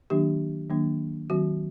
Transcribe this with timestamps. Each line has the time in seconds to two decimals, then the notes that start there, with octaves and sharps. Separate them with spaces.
0.10 D#3 F#3 A#3 D4 G4
0.70 D#3 F#3 A#3 D4
1.30 D#3 F#3 C4 F#4